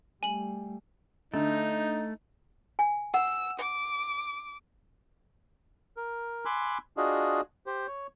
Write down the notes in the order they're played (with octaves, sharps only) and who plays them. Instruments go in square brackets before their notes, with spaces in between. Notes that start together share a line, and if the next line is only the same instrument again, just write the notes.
[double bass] G3 A3 [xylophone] G#5 F#7
[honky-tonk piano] D3 [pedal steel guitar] A3 [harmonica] D#4
[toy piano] G#5
[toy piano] F#5 [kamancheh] E6
[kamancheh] D6
[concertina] A#4
G#5 B5 C6 D6 E6 F#6
D4 F4 F#4 G#4 D#5
G4 C5
C#5